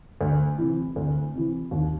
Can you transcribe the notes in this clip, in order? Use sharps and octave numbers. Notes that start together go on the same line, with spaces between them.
D2
C3 E3
D2
C3 E3
D#2